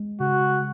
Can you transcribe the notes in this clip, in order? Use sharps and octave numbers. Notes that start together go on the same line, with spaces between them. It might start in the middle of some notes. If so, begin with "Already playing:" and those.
Already playing: G#3
C#3 F#4